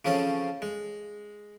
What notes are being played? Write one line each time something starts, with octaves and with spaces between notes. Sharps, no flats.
C#3 F3 C4 C#4 A4
G#3